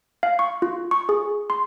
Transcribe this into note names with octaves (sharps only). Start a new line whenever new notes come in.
F5
C#6
F4
C#6
G#4
C6